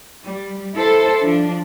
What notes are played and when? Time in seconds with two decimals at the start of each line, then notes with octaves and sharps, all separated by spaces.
0.23 G3
0.74 E4 A4 C5
1.22 F3 D4